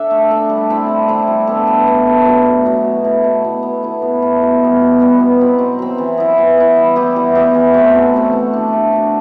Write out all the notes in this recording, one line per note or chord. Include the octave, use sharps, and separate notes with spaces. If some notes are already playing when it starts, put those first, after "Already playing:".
Already playing: D4 A4 E5
A3
D4 A4 E5
G3
C4 E4 A4
G3
C4 E4 A4
G3
B3 D4 A4
G3
B3 D4 A4
A2
F#3 B3 F#4
A2
F#3 B3 F#4
B2
A3 E4
B2
A3 E4
B3
E4 A4
B3
E4 A4
B2
G3 B3
B2
G3 B3
B2
F#3 C4
B2
F#3 C4
E3
B3 E4
E3
B3 E4
G3
B3 E4 G4
G3
B3 E4 G4
E3
A3 C4 F#4
E3
A3 C4 F#4
A3
D4 F#4
A3
D4 F#4